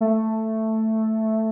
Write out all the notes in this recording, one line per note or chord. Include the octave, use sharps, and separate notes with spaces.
A3